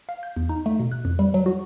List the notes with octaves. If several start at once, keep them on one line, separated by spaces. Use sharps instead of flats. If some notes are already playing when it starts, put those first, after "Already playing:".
F5
G6
E2
D#4
A3
B2
F#6
F2
G3
F#3
F#4